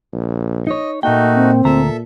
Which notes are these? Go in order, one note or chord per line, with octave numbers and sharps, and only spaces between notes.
A#1
D#4 C#5 D#5
A#2 A3 A#3 D#4 F#4 G5
C4
D2 A#2 A4 E5 A#5